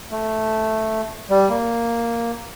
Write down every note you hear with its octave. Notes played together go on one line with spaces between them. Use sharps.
A3
G3
A#3